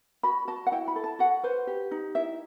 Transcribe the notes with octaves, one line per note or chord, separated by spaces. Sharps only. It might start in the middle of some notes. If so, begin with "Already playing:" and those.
F#4 B5
F#4 A5
F#5
E4 G5
B5
A4
A5
F#4 F#5
B4 C5
G4
D#4
E4 E5